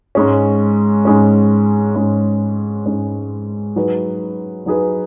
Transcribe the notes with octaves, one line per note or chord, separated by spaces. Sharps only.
G#2 G#3 C#4
G#2 G#3 C#4
G#2 G#3 C#4
G#2 G#3 C#4
F#3 D#4 G#4 B4
F#3 D#4 G#4 B4